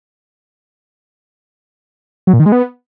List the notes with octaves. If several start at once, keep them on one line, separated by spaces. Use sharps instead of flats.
F#3
A#2
D#3
G#3
B3